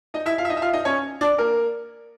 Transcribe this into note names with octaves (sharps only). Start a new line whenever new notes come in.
D#4 D#5
E4 E5
F4 F5
E5
D#4 D#5
E5
F4 F5
D#4 D#5
C#4 C#5
D4 D5
A#3 A#4